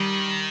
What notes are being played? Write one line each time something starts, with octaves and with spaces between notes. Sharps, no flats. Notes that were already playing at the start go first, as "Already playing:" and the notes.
Already playing: D#3 G3